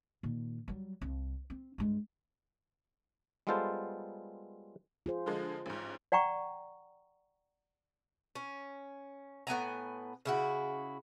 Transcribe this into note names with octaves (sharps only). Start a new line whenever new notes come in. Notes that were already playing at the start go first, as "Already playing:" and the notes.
A#2 D#3
F#3 G3
C2
C4
G2 G#3
G3 G#3 B3 F4 A4 C5
F4 G#4 C5
D3 F3 G#3
A1 G#2
D5 F#5 G5 A#5 C#6
C#4
A2 B3 G#5 A#5
C#3 E4 F#4